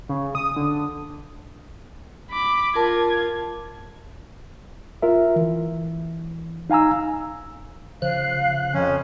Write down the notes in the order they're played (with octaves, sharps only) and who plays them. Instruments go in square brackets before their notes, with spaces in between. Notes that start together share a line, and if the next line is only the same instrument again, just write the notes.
[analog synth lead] C#3
D#6
D3
[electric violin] B5 D6
[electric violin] F4 G#6 [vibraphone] A#4 A5 D6
[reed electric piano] F4 A#4 E5
E3
D#4 F5 G#5 A#5 E6
[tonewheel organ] C#3 F3 F#6 [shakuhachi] F5
[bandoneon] F2 C#4